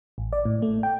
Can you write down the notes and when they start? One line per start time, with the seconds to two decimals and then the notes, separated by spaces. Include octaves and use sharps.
0.18 A1
0.33 D5
0.45 A2
0.62 A3
0.83 G5